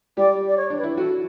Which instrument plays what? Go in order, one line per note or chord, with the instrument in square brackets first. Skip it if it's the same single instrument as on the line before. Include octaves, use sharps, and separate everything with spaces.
[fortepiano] G3 G4 [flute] D5
[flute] D5
C#5
[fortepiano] D4
[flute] B4
[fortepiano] E4
[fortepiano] F#3 F#4 [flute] A4